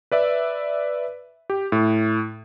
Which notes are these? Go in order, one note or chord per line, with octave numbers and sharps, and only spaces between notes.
B4 D5 E5
G4
A2